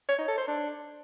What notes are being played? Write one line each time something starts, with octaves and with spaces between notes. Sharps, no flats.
C#5
D#4
A4
C5
D4